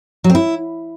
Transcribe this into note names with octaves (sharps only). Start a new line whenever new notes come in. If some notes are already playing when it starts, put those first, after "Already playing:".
F#3
C4
E4